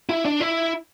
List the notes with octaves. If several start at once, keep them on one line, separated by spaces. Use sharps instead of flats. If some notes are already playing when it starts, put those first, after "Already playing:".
E4
D4
E4